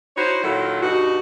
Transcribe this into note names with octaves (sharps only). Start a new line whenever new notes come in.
D#4 E4 F#4 C5 C#5
A#2 D#3 F#3 E4 F4 A4
G2 B2 D#4 F#4